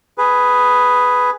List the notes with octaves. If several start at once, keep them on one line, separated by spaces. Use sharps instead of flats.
G#4 B4